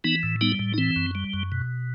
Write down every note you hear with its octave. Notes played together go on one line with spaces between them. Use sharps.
E3 B3 D#4
A2
G3 B3 D#4
A2
D#4
E3 C4
F#2
G3
F#2
B2